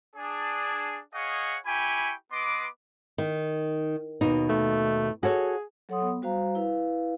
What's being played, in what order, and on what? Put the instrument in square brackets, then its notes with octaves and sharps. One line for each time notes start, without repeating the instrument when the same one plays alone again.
[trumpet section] D4 G#4
G#4 C#5 D#5 F5 F#5 C#6
E4 G4 G5 G#5 B5 C#6
B3 B4 D#5 C6 D6
[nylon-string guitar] D#3
D#2 B2 D#4
[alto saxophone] A3
[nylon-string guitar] F#4 A4 C#5 [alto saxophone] G#4
[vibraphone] F#3 A4 C#5 F#5 C6 D#6
B3
G3 F#4 C5 F5 A#5
E4 B4 F5